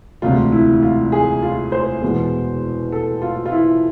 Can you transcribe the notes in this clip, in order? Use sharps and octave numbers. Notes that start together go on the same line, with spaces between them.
E1 D2 C3 F4
E4
F4
G#4
F4
C5
E2 B2 G#3 B3
A4
F4
F4
E4